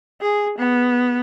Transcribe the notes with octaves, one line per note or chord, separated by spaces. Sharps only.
G#4
B3